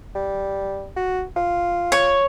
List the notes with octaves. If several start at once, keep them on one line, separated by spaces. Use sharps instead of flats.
G3
F#4
F4
C#5